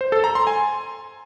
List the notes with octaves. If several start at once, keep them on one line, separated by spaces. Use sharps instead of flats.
C5
A4
A#5
C6
G#5